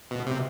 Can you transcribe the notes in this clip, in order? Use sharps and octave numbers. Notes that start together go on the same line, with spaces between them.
B2
C3